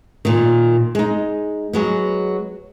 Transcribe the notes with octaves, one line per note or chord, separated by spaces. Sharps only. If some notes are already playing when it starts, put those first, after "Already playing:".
A#2 D#3
G#3 D#4
F#3 G#3 B3